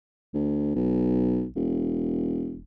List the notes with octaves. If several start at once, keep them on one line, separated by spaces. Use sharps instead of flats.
D2
B1
E1